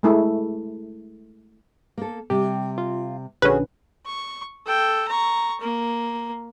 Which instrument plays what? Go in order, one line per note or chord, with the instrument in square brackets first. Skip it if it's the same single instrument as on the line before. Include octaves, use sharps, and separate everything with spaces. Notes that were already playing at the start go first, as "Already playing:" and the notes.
[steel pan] G#3 A3 E4
[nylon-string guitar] A#3 A4
[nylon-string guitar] C3 G3 [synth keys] G4
[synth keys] F4
[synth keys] A#1 D3 [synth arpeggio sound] C#4 B4 [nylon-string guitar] F#4 G#4
[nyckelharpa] C#6
A4 G5
A#5 C#6
A#3